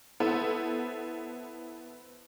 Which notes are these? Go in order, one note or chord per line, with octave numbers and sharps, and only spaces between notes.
B3 E4 A4 C5